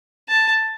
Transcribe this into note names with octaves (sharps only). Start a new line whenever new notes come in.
A5